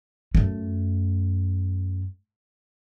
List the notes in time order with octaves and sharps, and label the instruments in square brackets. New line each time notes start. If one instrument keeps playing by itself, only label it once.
[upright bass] F#2 A3